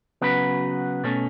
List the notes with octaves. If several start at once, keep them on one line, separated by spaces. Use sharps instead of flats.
C#3 F#3 B3 F#4 B4
B2 A3 C#4